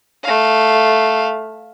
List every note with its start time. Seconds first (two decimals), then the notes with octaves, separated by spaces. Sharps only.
0.24 A3 F5